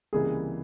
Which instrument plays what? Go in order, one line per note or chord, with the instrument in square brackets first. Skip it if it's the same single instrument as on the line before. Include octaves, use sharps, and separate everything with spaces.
[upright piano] C#2 C3 E3 G3 A#3 [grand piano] G#4